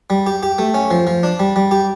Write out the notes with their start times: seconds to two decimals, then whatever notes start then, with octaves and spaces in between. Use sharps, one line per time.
0.10 G3
0.26 G4
0.43 G4
0.59 A3
0.74 C#4
0.91 F3
1.07 F3
1.23 D4
1.39 G3
1.56 G3
1.71 G4